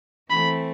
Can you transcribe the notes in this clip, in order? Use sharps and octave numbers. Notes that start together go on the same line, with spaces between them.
E3 A3 C4 B5